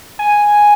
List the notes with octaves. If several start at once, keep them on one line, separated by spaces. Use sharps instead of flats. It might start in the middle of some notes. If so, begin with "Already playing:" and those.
G#5